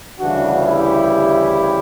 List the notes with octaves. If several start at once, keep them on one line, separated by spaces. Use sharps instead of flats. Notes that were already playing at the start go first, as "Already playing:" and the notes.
D2 C#3 E3 G3 D4 F#4
E4 G4